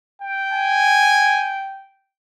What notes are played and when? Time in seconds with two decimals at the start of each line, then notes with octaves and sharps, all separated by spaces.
0.22 G5
0.52 G#5